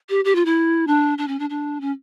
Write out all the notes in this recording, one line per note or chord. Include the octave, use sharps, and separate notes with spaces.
G4
G4
F4
E4
D4
D4
C#4
D4
D4
C#4